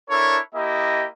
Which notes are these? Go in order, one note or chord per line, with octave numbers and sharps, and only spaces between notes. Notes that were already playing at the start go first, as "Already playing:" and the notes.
D4 E4 A4 A#4 C#5
A#3 E4 G4 D#5